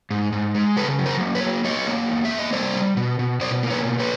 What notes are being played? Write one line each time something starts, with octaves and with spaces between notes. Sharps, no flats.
G#2
G#2
G#3
C#3 A4 B4
F#3
A#4 C5
A#3
B4 C#5
F#3
F#3 C#5 D#5
A#3
E2
E5
A#3
D#5
G3 C5 D5
G3
B2
B2
B2 C5 D5
A#3
B4 C#5
B2
B4 C#5